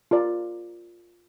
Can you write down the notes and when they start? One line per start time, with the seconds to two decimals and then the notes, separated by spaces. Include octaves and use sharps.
0.11 F4 A#4 D5